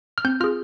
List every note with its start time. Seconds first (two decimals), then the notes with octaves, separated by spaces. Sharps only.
0.18 F6
0.25 C4 G6
0.40 F4 F6
0.44 G#4